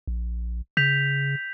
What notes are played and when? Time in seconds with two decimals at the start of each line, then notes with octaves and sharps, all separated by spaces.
0.07 A#1
0.77 C#3 G6 B6 F7